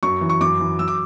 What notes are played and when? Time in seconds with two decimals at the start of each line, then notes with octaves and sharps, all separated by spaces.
0.03 F#2 C#6
0.21 E3
0.30 C#6
0.41 F#2 D6
0.60 E3
0.79 F#3 E6
0.88 D6